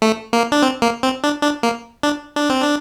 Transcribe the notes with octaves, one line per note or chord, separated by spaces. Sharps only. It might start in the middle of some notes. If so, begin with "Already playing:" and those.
A3
A#3
D4
C4
A#3
C4
D4
D4
A#3
D4
D4
C4
D4